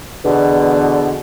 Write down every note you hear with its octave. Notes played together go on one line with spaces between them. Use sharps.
E2 B2 D3